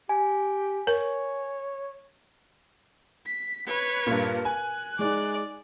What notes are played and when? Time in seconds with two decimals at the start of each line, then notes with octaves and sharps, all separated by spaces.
0.09 G4 G#5
0.87 A#4 C#5
3.26 B6
3.67 B4 C#5
4.07 G2 A#2 A#4
4.45 G#5 F#6
4.99 G#3 D#4 D5